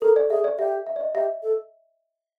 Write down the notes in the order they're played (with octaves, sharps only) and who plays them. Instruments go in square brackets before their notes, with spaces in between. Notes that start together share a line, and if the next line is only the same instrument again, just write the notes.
[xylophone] A4 [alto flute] A#4
[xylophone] D5
[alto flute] G#4 [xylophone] E5
[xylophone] D5
[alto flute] G4 [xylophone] E5
[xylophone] E5
D5
D#5
[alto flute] G4 [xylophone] E5
[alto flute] A4